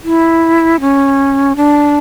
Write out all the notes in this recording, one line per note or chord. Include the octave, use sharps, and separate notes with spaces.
E4
C#4
D4